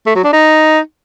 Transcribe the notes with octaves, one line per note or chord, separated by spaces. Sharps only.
A3
F#3
D4
D#4